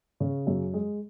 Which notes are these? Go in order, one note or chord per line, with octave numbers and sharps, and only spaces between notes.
C#3
F#2
G#3